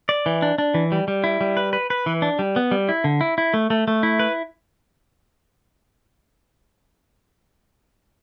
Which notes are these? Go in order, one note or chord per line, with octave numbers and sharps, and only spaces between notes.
D5
E3
D4
D4
E3
G3
G3
E4
G3
B4
B4
B4
E3
D4
G3
B3
G3
E4
D3
E4
E4
A3
A3
A3
E4
B4